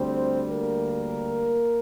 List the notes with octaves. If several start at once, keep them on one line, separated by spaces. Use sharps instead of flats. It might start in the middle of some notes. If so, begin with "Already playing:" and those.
Already playing: D2 D3 G3 C4 C5
A#3 A#4